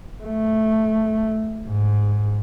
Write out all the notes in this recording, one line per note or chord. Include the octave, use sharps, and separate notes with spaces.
A3
G#2